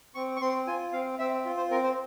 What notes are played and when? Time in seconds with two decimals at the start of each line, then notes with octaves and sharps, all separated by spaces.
0.15 C4 C#6
0.36 C#6
0.41 C4 C6
0.67 F4 G#5
0.93 C4 F5
1.19 C4 E5
1.45 F4
1.57 C5
1.71 C4 A#4
1.84 C5